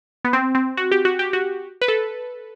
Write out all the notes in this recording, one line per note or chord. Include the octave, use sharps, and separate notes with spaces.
B3
C4
C4
F#4
G4
F#4
G4
F#4
B4
A4